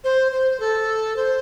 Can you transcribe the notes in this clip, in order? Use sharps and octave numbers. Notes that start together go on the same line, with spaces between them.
C5
C5
A4
C5